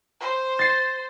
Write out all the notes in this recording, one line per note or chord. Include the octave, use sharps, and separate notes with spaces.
C5
A6 C7